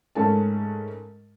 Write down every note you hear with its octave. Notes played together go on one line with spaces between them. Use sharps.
G#2 A3 C#4 A#4 A5